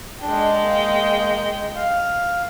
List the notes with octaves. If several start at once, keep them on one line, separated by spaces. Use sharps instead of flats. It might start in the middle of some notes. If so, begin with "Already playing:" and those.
G#3 D4 G5
A#3
F5